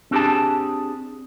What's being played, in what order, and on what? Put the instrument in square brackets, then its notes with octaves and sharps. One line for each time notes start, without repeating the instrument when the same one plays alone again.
[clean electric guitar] C4 D4 G4 G#4 A5